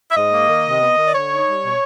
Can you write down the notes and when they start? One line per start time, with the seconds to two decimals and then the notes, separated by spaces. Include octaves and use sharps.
0.12 E5
0.17 G#2 D#5
0.33 A#3
0.50 D#3
0.65 C3
0.82 B3
0.98 D#3
1.07 D5
1.15 D3 C#5
1.31 D#4
1.47 G3
1.64 B2